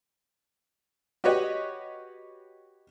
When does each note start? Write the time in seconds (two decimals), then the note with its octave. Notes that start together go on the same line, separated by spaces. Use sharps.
1.24 F#4 G4 B4 C#5 D#5